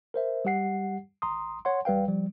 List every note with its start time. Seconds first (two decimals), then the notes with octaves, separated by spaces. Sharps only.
0.14 A#4 C5 E5
0.45 G3 G4 F#5 C7
1.22 G#1 A#5 C6 D#6
1.65 C#5 F#5 C6
1.85 A1 G3 B4 F5 G5
2.08 F3 G3